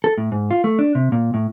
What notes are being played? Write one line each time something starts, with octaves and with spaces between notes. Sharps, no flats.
A4
A2
G#2
F4
A3
D4
C3
A#2
A2